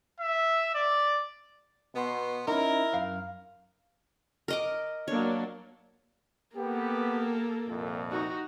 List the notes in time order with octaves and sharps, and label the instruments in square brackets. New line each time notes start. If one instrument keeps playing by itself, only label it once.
[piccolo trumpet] E5
D5
[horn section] B2 B3 C6
[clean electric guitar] C#4 D#4 [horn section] E4 A#4
[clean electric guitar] F#2 F5
[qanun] A#4 D#5 D6
[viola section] F#3 A#3 D4 [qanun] C#5
[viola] A#3 A4 [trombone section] B3 G4
[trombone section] C2 F2 A#2
[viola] D#4 F#4